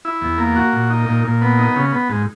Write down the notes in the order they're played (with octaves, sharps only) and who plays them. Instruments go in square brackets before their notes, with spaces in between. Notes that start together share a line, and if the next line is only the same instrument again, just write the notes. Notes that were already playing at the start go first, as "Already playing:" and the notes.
[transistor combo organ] E4
E2
A#3
F#4
A#2
D#4
A#2
A#2
B3
D#4
C#3
B3
G#2